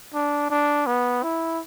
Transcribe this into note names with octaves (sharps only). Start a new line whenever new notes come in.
D4
D4
B3
E4